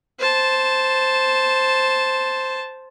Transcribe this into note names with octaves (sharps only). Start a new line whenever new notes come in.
C5 A5